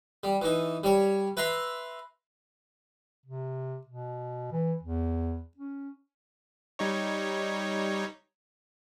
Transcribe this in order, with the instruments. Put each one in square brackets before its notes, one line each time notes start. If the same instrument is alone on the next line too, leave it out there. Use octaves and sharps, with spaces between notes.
[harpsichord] G3
E3 D#4
G3 C#5
B4 E5 A#5 C6
[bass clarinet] C3
B2
E3
E2
C#4
[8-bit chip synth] G3 D#4 C#5